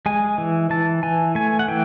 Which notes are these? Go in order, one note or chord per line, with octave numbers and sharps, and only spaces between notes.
G#3 G#5
E3
E3 A5
E3 G#5
A3 G#5
F#5
E3 G5